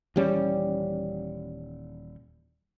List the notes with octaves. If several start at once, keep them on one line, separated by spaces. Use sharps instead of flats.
D#1 E3 G3 C#4